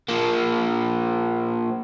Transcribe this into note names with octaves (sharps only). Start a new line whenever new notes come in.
F3 A#3